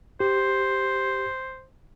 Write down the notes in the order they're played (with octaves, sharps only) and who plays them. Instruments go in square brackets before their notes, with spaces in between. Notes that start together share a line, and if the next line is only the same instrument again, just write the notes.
[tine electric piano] G4 [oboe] C5